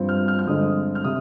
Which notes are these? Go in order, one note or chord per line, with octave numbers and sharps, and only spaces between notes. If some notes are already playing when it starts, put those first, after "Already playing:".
Already playing: G2 F3 C4 F4
F6
F6
F6
G2 D3 G#3 C4 D#6
F6
C3 D#6